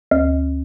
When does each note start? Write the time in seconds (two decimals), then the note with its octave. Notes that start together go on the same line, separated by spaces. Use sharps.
0.11 D2